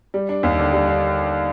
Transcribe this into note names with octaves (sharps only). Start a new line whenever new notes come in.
G3
D4
D#2
D3
G3
D4